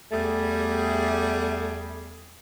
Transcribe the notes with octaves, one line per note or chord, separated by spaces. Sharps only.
E2 G3 A3 G#4